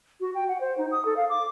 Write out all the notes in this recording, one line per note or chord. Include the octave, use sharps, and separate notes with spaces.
F#4
G5
F#5
C5
D#4
D#6
A4
F5
D6